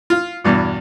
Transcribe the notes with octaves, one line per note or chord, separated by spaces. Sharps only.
F4
E2 G2 B2